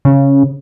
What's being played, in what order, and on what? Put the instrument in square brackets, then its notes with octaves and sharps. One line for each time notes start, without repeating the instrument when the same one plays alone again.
[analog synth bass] C#3